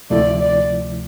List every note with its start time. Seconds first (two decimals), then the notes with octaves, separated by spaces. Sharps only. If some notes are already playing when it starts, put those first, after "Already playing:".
0.10 D2 C3 F3 A3 E4 D5
0.39 D5